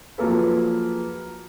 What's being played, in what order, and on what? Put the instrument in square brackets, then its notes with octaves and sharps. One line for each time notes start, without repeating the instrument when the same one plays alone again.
[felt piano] F3 F#3 A#3 G#4 A4 B4